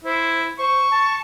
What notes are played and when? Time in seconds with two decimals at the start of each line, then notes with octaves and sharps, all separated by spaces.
0.05 E4 C5
0.59 C5 C#6
0.91 A5